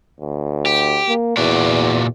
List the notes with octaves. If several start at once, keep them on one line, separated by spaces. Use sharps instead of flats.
D2
G4
A#3
E2 A#2 F#4 D5